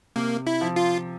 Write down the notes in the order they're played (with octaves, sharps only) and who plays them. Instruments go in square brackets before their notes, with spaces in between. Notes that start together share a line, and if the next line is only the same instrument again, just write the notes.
[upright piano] C3 [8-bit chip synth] A#3
[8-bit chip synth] E4
[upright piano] F3
[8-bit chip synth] F4